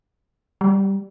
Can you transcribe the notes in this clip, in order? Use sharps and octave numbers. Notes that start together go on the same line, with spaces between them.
G3